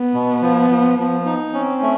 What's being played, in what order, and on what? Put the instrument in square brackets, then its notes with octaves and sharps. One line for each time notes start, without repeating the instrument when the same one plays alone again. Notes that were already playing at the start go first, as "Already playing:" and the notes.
Already playing: [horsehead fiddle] B3
[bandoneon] B2
F3
F3
F3
D#4
[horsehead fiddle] C4 [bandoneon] C#4
[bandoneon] A3